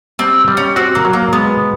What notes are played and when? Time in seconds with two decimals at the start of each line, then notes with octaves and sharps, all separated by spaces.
0.19 G3 C4
0.48 G3
0.57 C#4
0.76 C4 F#4
0.95 A#3
1.05 F#3
1.13 A#3
1.33 G#3 B3